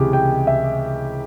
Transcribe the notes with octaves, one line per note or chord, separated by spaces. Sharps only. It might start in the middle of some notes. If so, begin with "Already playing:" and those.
Already playing: C#2 C3 E3 G4 G#4
G5
E5